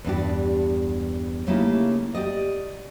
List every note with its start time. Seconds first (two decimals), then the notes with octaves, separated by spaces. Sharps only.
0.04 E2 G2 D4 G4
1.47 C#3 A3 A#3 D#4 E4 G4
2.15 G4 D5 D#5